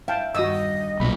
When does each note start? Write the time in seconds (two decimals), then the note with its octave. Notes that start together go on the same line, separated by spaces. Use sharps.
0.08 E4 F5 G5 A5
0.35 E2 G2 D#3 F#4 D#5 D#6 E6
1.00 B1 A#2 B5